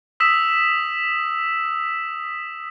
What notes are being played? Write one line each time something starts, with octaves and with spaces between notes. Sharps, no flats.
D#6 E6 B6 E7